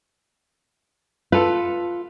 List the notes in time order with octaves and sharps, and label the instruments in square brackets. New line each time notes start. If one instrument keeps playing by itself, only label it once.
[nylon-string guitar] F4 [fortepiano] A4 B4